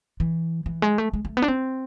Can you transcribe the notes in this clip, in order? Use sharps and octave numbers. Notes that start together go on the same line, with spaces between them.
E3
E3
G#3
A3
G#3
A3
B3
D4
C4